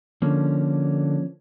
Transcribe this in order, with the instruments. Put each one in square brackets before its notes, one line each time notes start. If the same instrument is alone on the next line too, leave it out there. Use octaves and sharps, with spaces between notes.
[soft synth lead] D3 [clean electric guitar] F3 A#3 C#4